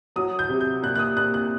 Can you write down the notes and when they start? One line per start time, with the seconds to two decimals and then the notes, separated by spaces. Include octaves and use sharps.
0.16 F#3 D#6
0.39 G6
0.49 C3
0.61 G6
0.83 A#2 F#6
0.96 F#6
0.99 D#6
1.17 A#2 F#6
1.34 F#6